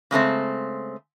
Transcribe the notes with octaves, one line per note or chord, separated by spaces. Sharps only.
C#3 G#3 A3 C4